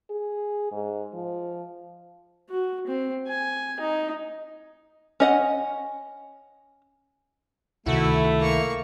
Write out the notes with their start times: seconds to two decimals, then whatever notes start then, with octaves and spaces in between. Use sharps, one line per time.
0.10 G#4
0.72 G#2
1.13 F3
2.50 F#4
2.87 C4
3.28 G#5
3.80 D#4
5.20 C#4 D#5 F#5
7.86 C#2 C3 D#3 A3 E4 F#4
8.39 A#3 C#6